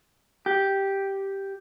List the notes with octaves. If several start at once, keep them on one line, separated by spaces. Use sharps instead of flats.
G4